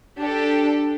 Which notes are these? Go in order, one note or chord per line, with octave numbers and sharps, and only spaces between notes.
D4 G4 A4